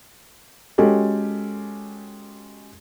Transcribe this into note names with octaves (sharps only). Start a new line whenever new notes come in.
G#3 C#4 F#4 G4 A4